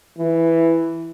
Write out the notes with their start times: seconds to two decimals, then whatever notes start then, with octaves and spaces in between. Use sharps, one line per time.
0.18 E3